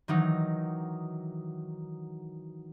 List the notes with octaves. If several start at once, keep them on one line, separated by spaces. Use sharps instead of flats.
D#3 E3 F#3 D#4